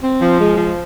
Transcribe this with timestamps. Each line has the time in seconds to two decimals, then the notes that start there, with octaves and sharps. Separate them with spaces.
0.03 C4
0.21 F3
0.39 G#3
0.57 F3